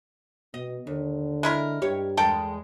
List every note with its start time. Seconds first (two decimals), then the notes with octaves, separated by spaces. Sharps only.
0.54 B2 D#5
0.87 D#2 D3
1.43 G#3 E4 A#4
1.82 G2 G4 C#5
2.17 E2 G#3 A4 A#4 G5